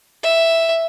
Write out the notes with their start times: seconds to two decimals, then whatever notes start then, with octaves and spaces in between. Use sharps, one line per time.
0.23 E5